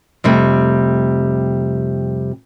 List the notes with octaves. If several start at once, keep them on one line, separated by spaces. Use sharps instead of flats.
F2 C3 G3 A3